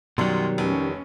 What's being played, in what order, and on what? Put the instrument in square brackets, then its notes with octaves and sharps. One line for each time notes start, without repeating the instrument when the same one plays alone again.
[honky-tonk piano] F#2 C6 [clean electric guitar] B2 F#3 [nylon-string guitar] D#3 G3
[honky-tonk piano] F1 [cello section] C#4